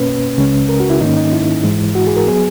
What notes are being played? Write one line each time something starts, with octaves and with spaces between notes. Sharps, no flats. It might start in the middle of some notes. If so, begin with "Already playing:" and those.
Already playing: B2 A#3 C#4 B4
C#2 C#3 G#3 C#4
A#4
F#4
E4
G#2 D#3 A#3 C#4 D#4
D#4
E4
G#2 E3 G#3
F#4
G#4
A#4
F#3 B3 G#4